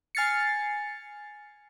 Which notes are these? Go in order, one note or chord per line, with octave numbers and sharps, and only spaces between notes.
G#5 F6 A6 C7 C#7